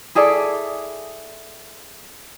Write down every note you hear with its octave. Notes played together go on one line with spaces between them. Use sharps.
E4 G#4 A4 D5